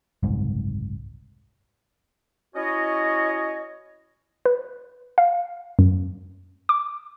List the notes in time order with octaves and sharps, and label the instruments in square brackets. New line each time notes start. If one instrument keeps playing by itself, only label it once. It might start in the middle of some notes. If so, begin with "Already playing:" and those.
[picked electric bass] F#1 C2 G#2
[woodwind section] C#4 E4 F#4 C#5 D#5
[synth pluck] B4
F5
F#2
D6